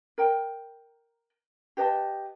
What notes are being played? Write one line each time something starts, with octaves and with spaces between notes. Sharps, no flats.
A#4 G5
G4 B4 D#5 A5